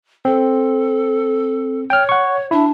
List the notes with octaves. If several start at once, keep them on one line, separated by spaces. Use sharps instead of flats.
C4 A4
C#5 G5 F6
F#5 C#6
D4 E4